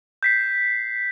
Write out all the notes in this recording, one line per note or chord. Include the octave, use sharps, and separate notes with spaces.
G6 B6 C7